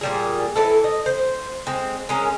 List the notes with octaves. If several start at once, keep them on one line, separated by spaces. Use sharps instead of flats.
A#2 G3 G#4
E3 E4 A4
D#5
C5
G#3 C4
G#3 C#4 A#4